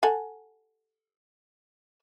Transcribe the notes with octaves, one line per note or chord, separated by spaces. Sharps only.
A4 F#5 G#5